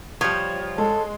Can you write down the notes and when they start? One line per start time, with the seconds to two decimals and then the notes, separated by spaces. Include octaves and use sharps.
0.21 F3 G3 C#5
0.78 G#3 A4